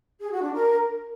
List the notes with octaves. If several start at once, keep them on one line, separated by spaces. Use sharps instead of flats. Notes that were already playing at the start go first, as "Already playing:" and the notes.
G#4
F#4
D4
A#4